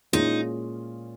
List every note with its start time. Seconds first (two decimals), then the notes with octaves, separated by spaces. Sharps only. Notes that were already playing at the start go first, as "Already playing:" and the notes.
0.13 A#2 G#3 C#4 D#4 F4 G#4